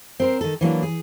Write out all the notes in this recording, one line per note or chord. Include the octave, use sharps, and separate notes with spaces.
C4 A#4 C5
D#3 A4
E3 F#3 A#3 D4
G#4